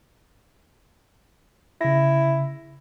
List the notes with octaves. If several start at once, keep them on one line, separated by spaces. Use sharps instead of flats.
C#3 E4 A#6